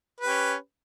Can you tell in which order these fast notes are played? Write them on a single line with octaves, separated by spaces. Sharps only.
B4 G4 C#4